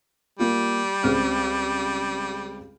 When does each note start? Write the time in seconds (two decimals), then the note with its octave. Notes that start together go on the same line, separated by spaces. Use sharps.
0.39 G3 A#3 F4
1.03 C#2 C4 F6